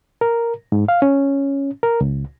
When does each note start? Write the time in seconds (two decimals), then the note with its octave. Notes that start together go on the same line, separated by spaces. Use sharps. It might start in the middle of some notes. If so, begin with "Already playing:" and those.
0.21 A#4
0.72 G#2
0.88 F5
1.02 C#4
1.83 A#4
2.01 C#2